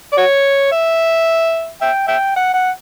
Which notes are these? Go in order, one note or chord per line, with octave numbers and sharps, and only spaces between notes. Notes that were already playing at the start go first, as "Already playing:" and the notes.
D5
F#4 C#5
E5
E5 G5
E5 G5
F#5
F#5